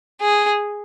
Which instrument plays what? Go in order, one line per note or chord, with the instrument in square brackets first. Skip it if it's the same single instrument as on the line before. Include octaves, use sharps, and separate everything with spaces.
[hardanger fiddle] G#4